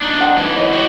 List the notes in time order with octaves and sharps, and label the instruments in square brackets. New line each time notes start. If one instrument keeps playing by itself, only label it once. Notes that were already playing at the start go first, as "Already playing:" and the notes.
[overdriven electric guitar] D4 D#4
[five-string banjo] F4 F#5 A5
[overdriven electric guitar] G#2 E3
[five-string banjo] C#5 D#5
[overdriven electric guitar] F#4 G4